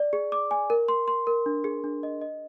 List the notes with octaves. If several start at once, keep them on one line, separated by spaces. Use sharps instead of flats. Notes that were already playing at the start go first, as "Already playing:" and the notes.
Already playing: D5
G#4
D6
G#5
A#4
C6
C6
A#4
D4
G#4
D4
D#5
D#5